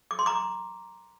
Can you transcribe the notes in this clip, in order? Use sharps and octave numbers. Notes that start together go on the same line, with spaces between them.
D6
C6
A#5 D6